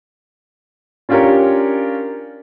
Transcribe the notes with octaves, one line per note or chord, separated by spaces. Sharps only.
C#4 D4 F4 G4 A#4 C#5